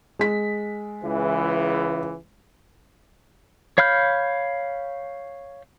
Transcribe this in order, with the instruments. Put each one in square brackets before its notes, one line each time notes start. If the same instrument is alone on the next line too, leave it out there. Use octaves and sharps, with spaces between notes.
[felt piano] G#3 B6
[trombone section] C#2 E3
[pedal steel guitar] C#5 F5 B5 F6 G6